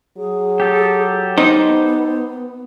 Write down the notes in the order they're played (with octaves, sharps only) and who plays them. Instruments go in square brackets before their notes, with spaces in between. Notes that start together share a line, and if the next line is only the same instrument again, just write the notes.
[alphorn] F#3 [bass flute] G#4
[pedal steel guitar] G4 A4
[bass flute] B3 [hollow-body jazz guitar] D#4 C5